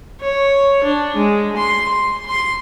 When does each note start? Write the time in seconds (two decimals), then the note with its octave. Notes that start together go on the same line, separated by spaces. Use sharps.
0.21 C#5
0.84 D4
1.16 G#3
1.56 C6
1.89 C6
2.26 C6